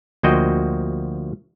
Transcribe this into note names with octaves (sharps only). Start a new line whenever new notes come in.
D2 F3 A#3 F#4 D#5 G5